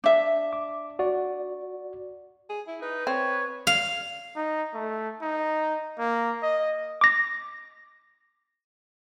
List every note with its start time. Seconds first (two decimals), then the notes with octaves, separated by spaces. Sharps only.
0.04 D4 E5
0.53 D6
0.99 F#4 D5
2.50 G#4
2.68 E4
2.82 D#4 B4
3.07 C4 C#5
3.67 F5
4.36 D#4
4.74 A3
5.22 D#4
5.99 A#3
6.43 D#5
7.01 D6 A#6